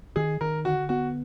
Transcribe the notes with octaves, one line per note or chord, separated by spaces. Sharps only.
D#3 G#4
D#3 A#4
D3 F#4
B3 F#4